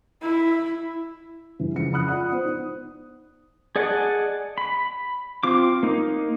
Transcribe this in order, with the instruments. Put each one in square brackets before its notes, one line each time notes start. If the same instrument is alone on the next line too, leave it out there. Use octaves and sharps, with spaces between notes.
[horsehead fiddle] E4
[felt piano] G2 E3 E4
F2 C#3 G#3 C#7
B5 D#6 F#6
F4 D5 F#5 B5 D#6
B3 C5
D#4
[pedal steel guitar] G#4 D5 D#5 F#5 A5
B5
C4 F4 D6
A#3 D#4